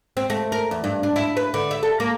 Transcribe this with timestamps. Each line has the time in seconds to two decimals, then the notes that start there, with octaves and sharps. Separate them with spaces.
0.17 C4
0.30 A3
0.52 A#4
0.71 E2
0.84 G2
1.03 D4
1.16 E4
1.37 B4
1.54 D3
1.71 E5
1.83 A4
2.00 A#3